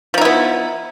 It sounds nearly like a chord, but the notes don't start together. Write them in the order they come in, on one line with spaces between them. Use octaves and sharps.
F3 D#4 E4 B3